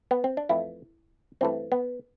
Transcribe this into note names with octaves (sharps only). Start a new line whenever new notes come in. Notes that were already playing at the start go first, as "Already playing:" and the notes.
B3
C4
D4
F2 E3 A3 E4
G2 E3 A3 C4
B3